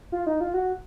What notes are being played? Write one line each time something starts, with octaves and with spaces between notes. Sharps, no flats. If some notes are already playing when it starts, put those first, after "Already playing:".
F4
D#4
F4
F#4